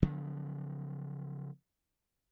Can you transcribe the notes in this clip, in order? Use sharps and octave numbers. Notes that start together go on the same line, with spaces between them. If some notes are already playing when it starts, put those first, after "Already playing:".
C#3 F3 F#3 B3